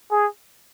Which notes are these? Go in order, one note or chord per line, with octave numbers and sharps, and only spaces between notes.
G#4